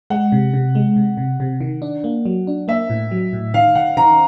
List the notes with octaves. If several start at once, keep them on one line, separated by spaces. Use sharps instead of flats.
G#3 F#5
C3
C3
G#3
C3
C3
C3
D#3
D4
A#3
F#3
D4
A#3 E5
A2
F#3
A2
D#3 F5
D#3 F#5
D#3 A#5